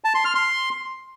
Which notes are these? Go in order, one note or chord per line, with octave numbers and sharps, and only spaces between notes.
A5
C6
F6
C6